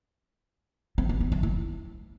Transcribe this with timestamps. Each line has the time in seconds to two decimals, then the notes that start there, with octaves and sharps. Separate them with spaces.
0.98 C4
1.09 B3
1.20 B3
1.32 A3
1.43 E4